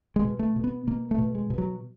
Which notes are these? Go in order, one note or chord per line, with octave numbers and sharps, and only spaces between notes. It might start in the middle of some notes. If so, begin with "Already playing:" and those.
G#3
B2
A3
B2
B3
B2 A#3
A3
B2
G#3
B2
F#3